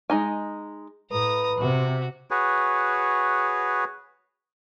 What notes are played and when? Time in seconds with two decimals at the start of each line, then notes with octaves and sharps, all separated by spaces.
0.10 G#3 D#4 G#5
1.11 A2 B4 A#5 D#6
1.59 C3 F#4
2.31 F#4 G#4 B4 C#5